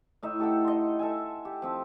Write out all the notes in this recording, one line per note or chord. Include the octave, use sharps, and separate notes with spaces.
A2 D#4 E5
G4 A4 F#5 G5
D#5 C6
A4 E5 G#5
G4
F3 C4 G4